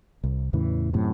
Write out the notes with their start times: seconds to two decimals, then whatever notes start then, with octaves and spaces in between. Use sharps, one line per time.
0.24 C2
0.53 E2 A2 C#3 E3
0.93 F#2 A2 C3